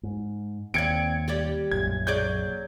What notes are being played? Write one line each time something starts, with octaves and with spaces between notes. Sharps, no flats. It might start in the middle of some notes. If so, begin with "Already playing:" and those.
G#2
D#2 C4 D5 G#6 C#7 D7
G3 G4 D5
B1 F#2 A#2 G#6
F#3 G#4 D5 G6